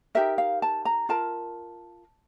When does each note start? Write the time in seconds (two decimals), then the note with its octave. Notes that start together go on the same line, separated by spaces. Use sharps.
0.15 D#4 G4 A#4 E5
0.38 F5
0.62 A5
0.85 A#5
1.09 F4 A#4 A5